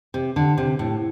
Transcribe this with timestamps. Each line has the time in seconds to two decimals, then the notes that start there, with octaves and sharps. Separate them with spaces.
0.14 C3
0.36 D3
0.58 C3
0.79 A2